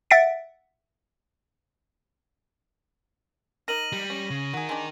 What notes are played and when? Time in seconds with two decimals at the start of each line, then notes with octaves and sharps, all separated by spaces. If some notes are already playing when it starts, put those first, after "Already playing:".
0.11 E5 F#5 A6 B6 D7
3.68 D#4 A#4 A#6 D#7 F#7
3.92 G3
4.10 C#4
4.30 C#3
4.53 D#4 F#4 G#4 A#4
4.69 G#3 D4